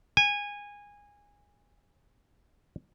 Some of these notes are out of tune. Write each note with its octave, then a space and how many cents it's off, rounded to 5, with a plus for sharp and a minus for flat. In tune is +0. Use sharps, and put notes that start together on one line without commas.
G#5 -20